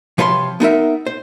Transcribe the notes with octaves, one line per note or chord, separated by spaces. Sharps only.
C3 F3 B4 C#5 D#5 C6
B3 D#4 A#4 E5
C5